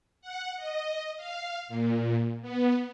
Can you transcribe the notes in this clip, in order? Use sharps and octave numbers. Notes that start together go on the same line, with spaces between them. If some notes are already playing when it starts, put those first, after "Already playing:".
F#5
D#5
F5
A#2
B3